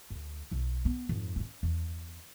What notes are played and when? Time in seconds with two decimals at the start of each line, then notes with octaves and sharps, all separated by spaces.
0.10 D2
0.51 B1 E4
0.85 B3
1.09 F2 G#2
1.36 B3 C#4
1.63 E2